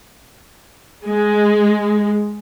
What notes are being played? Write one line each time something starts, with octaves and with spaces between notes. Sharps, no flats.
G#3